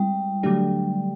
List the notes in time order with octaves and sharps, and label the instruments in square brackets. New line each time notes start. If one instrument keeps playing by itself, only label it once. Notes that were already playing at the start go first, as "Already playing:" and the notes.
Already playing: [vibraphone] G3 [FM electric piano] G#3 C4 E4
[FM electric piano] D3 F#3 A3 D4 G4